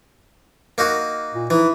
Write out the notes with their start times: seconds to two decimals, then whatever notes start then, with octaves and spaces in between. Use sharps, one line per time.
0.78 A#3 D#4 F#4
1.34 A#2
1.50 E3 D#4 E4